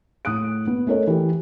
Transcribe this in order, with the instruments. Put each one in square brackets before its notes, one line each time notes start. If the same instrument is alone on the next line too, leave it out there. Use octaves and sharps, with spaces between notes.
[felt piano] A2 D#6 F#6 D7
B3
A3 C#4 A4 A#4 C#5 D#5
E3 G4